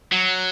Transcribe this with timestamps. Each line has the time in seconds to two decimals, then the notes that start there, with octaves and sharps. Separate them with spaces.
0.12 F#3